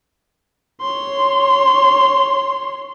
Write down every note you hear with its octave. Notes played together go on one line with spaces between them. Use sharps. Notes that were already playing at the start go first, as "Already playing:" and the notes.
C#5 C6